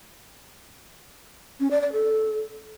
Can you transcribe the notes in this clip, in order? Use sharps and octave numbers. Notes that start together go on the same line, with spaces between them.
C#4
D5
D5
A4